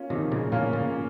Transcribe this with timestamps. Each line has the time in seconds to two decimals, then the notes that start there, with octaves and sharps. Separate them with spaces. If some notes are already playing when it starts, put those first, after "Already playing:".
Already playing: A#3 C#4 F4
0.10 C3 D#3 F3
0.32 A#2 C#3
0.52 A#2 A#3 C#4 F4
0.73 A#2 C#3